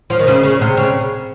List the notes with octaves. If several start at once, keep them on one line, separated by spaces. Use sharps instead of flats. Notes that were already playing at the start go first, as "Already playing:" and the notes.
F3
D#3
C#3
C#3
C3
C#3